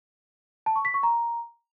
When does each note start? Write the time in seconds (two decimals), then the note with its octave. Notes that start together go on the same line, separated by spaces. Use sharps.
0.66 A5
0.76 C#6
0.85 B6
0.94 C#6
1.03 A#5